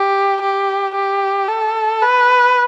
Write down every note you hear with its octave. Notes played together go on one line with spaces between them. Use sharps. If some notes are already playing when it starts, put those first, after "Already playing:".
Already playing: G4
G4
G4
A4
B4